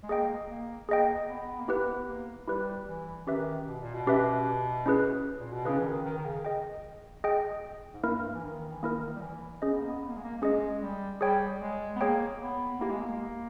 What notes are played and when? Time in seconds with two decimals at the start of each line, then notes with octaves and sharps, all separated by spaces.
0.03 G#3
0.09 A#3 G#4 D#5 G5
0.49 A#3
0.89 A#3 G#4 D#5 G5
1.28 B3
1.59 A#3
1.68 B3 E4 G4 B4
2.08 A#3
2.48 G3 E4 G4 B4
2.87 E3
3.27 D#3 C#4 G4 B4 E5
3.67 B2
3.81 A#2
3.94 B2
4.07 C#4 G4 B4 E5
4.86 C#4 E4 G#4 B4
5.39 A#2
5.52 B2
5.65 C#3 C#4 E4 G#4 B4
5.78 E3
5.85 D#3
6.05 D#3
6.18 D#3
6.25 C#3
6.45 G#4 D#5 G5
7.24 G#4 D#5 G5
7.93 G#2
8.03 G2 A#3 E4 A#4
8.34 E3
8.43 D#3
8.71 E3
8.83 D#3 A#3 E4 A#4
9.15 G3
9.22 E3
9.62 C#4 G#4 D#5
9.71 B3
9.80 A#3
9.89 B3
10.02 B3
10.09 A#3
10.17 G#3
10.24 A#3
10.37 A#3
10.42 G#3 C#4 G#4 D#5
10.81 G3
11.21 G3 G#4 C#5 G5
11.61 G#3
11.96 B3
12.00 A#3 G#4 C#5 G5
12.40 B3
12.79 A#3 B3 E4 G4
12.90 G#3
13.01 A#3